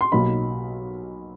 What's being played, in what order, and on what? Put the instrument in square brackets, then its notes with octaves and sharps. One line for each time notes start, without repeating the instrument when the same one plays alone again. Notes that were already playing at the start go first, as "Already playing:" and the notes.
[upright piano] C6
B1 B2 F#3 A#3 D#4 B5